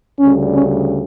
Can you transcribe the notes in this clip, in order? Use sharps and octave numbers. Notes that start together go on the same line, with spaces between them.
D2 C#3 G3 C#4
C#4